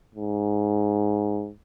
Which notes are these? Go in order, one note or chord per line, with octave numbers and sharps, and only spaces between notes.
G#2